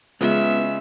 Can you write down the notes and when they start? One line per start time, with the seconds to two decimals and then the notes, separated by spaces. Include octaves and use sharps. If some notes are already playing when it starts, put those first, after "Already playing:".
0.21 C#3 G#3 B3 F4 E5